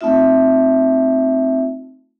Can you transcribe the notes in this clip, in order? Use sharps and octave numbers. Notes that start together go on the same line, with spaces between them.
A3 C4 D#4 F4 E5